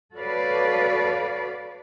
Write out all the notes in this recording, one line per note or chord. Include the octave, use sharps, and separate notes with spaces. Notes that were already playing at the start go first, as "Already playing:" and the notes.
F#4 A4 B4 C#5 D5 F5